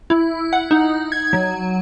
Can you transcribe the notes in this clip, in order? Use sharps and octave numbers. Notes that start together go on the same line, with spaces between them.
E4
F#5
D#4
G#6
F#3